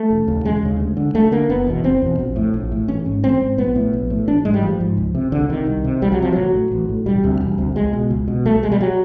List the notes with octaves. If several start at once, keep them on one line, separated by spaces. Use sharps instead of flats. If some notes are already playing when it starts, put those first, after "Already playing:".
Already playing: A3
E1
D#2 C#3
E1 G#3
D#2 C#3
D2
D3
D2 A3
D3 A#3
F#1 B3
E2 B2
F#1 C4
E2 B2
A#1
A2
A#1
A2
A1 C#4
G#2
A1 C4
G#2
A#1 B3
A2
A#1
A2
A1 D4
G#2 G#3
G3
A1 F3
G#2
C#2
C3
C#2 D3
C3 D#3
C2
C3
C2 G3
F#3
C3 F3
A1 F#3
A2
A1
A2
E1 G3
D2 C3
E1
D2 C3
C#2 G#3
B2
C#2
B2
C2 A3
B2 G#3
G3
F#3